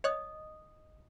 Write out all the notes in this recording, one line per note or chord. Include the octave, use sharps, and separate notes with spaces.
C#5 D#5 D#6 F#6